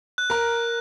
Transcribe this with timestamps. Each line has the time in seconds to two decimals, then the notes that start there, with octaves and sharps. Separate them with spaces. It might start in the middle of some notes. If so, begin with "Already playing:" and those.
0.18 F#6
0.30 A#4 A#5